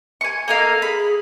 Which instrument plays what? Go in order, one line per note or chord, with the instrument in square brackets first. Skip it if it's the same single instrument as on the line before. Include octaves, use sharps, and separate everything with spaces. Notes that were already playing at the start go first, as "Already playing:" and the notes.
[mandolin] G#5 C#6
[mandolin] A#3 D#4 F5 [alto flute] A4
[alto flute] G#4 [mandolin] B5